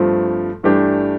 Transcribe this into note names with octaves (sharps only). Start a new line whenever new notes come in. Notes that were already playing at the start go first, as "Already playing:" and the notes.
Already playing: G2 F3 A3 C4 F4
G2 E3 A3 D4 G4